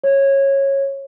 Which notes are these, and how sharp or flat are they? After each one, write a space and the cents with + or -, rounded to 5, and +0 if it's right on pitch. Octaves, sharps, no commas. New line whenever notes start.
C#5 -15